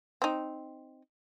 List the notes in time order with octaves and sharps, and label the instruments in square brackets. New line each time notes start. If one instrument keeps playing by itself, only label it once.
[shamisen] C4 D#4